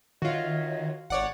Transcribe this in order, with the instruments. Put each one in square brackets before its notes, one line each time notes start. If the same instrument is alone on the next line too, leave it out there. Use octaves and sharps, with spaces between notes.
[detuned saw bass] D#3 [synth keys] F4 F#4 [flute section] C#5 D#5 E5
[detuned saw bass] G#1 [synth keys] C#5 D5 F#5